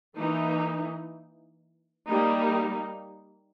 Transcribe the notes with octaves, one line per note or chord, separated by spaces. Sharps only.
E3 A#3 D#4
G3 A#3 D#4